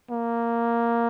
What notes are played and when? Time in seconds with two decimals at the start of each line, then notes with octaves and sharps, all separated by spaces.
0.10 A#3